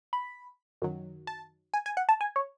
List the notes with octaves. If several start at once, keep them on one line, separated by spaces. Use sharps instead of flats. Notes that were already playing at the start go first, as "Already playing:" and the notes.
B5
F#2 D#3 F#3
A5
G#5
G#5
F#5
A5
G#5
C#5